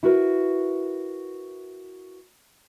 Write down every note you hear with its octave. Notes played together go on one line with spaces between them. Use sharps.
E4 F#4 A#4 B4